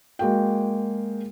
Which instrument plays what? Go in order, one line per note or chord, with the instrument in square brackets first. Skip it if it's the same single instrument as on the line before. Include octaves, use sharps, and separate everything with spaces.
[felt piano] G#3 A#3 F#4 G5